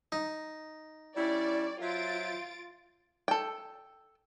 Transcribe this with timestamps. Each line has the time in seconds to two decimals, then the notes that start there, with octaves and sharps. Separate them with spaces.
0.12 D#4
1.17 G3 C#4 E4 D5
1.81 F#3 F4 C5 E5 A6 D7
3.28 A4 G5